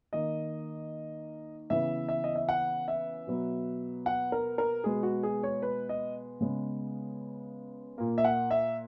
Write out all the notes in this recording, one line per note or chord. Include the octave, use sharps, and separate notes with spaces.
D#3 A#3 D#5
C#3 E3 B3 E5
E5
D#5
E5
F#5
E5
B2 F#3 B3
F#5
A#4
A#4
B2 G#3 B3 G#4
F#4
G#4
C#5
B4
D#5
C#3 G#3 B3
A#2 A#3
E5
F#5
E5